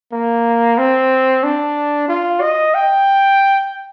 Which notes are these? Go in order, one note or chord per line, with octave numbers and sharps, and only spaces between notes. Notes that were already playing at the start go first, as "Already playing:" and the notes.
A#3
C4
D4
F4
D#5
G5